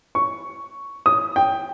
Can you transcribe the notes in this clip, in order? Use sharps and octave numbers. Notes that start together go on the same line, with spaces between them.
C#6
D#6
G5